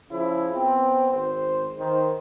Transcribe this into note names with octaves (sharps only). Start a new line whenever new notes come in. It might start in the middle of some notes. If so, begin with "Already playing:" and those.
C#3 F3 E4
B3 C4
G#1 C5
D#3 C5